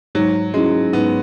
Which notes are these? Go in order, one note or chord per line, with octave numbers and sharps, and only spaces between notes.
G#2 F#3
F#3 G#3 C#4 E4
G#2 B3